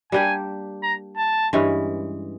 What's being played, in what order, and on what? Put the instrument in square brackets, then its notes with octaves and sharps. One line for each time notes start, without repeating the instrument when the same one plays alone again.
[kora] G3 A#3 D4 G4 [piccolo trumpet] G#5
[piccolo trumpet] A#5
A5
[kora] G2 E3 G#3 C#4